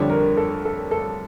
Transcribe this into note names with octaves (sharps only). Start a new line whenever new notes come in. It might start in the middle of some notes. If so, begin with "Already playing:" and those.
Already playing: F2 D3 G3 D4 C#5
A#4
A4
A4
A4